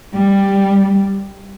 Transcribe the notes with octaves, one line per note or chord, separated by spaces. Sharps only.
G3